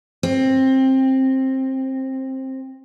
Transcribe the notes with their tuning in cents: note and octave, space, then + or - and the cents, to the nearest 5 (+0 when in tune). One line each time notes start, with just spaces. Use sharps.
C4 +15